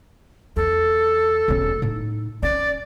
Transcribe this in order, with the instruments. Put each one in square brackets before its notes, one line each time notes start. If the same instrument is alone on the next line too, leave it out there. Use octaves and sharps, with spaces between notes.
[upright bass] E2 [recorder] A4
[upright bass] E1 C#4
A2 D#4
[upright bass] C#4 [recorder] D5